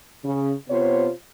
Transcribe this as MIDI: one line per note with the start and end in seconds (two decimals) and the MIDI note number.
0.24 0.52 49
0.69 1.08 48
0.69 1.08 59
0.69 1.08 65
0.69 1.08 72
0.69 1.08 73